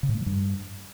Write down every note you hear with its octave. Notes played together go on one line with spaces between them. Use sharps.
C#3
A2
A3
F3
G2